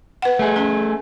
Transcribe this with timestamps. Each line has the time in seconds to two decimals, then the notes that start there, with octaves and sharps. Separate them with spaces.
0.22 B4 F#5
0.39 A3 G#4
0.56 C#4 A4